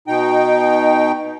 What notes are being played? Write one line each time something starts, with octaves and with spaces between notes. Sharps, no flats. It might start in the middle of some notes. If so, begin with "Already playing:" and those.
B2 D#4 G5